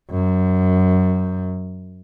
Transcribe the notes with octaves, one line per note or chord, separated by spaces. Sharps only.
F#2